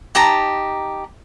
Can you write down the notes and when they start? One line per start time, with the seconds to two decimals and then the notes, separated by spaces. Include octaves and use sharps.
0.15 D#4 G4 A5 A#5